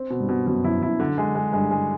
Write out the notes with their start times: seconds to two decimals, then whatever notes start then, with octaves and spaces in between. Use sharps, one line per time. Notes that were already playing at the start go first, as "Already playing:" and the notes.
Already playing: C4
0.10 B2
0.20 G2
0.29 B2
0.47 F#2 B2
0.64 F#2 E4
0.82 F#2 E4
0.99 D3
1.18 G#3
1.35 G#3
1.53 G2 G#3
1.71 G#3